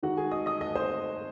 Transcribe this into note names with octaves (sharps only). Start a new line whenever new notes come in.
D#3 G#3 D#4 F#4 F#5
G#4 G#5
D#5 D#6
D#5 D#6
D#5 D#6
C5 C6